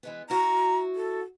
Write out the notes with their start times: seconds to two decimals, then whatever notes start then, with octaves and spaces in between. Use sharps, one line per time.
0.03 E3 G#3 B3
0.30 E4 F#4 A#5
0.95 A4